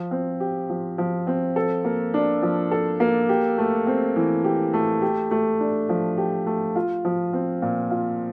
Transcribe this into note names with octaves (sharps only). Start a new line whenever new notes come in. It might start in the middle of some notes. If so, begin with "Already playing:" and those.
Already playing: F3
C4
G4
F3
F3
C4
A4
A#3
D4
F3
A4
A#3
G4
A3
C4
E3
G4
A3
G4
A3
D4
F3
G4
A3
F4
F3
C4
A#2
F4